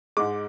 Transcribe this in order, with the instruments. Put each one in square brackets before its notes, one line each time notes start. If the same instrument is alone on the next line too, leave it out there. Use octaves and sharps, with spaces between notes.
[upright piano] G#2 G#3 D6